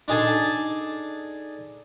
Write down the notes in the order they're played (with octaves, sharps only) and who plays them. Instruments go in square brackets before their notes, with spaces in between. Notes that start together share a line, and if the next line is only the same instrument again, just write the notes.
[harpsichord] D4 D#4 G#4 A4 G#5 A5